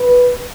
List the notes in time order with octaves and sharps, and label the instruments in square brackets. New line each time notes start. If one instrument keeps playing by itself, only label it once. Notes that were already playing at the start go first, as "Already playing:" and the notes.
Already playing: [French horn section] B4